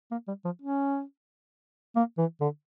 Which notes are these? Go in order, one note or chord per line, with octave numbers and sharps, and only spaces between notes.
A#3
G3
F3
C#4
A#3
E3
D3